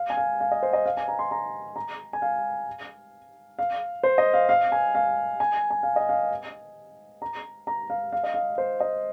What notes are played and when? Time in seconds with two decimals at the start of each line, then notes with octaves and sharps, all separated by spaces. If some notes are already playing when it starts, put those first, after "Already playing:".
Already playing: F5
0.10 G#5
0.17 F5
0.40 F5
0.51 D#5
0.63 C5
0.73 D#5
0.86 F5
0.97 G#5
1.08 A#5
1.19 C6
1.31 A#5
1.76 A#5
2.13 G#5
2.22 F5
3.59 F5
4.03 C5
4.18 D#5
4.34 F5
4.49 F5
4.72 G#5
4.95 F5
5.40 G#5
5.70 G#5
5.83 F5
5.96 D#5
6.09 F5
7.22 A#5
7.67 A#5
7.90 F5
8.13 F5
8.24 D#5
8.34 F5
8.58 C5
8.80 D#5